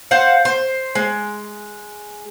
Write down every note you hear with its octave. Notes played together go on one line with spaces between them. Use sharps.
C5 F5 F#5
C5
G#3